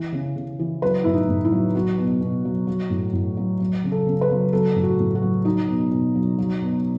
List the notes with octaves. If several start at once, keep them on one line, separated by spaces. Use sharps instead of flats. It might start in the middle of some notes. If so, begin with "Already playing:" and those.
Already playing: E3
C#3
C#3
E3
F#3 B4
A2 E4
D#4
A2
E4
F#3
F#3 F#4
B2
B2
F#3
F#3
A2
A2
F#3
F#3
C#3
A4
C#3
B4
F#3
F#3 A4
A2
F#4
A2
F#4
F#3
F#3 D#4
B2
B2
F#3
F#3
B2